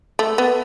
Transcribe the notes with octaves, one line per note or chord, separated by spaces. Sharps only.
A3
B3